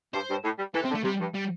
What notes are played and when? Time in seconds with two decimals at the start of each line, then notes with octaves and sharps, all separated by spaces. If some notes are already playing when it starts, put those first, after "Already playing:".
0.14 G2 C5
0.30 G2
0.45 A2
0.59 G3
0.75 E3 A4
0.83 C3 C4
0.90 D3
0.95 A3
1.04 C3 G3
1.21 G2
1.35 G3